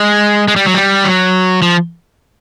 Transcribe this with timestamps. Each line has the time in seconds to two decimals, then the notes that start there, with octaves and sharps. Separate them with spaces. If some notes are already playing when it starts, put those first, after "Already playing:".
Already playing: G#3
0.48 G#3
0.56 G3
0.66 F#3
0.74 G3
1.04 F#3
1.62 F3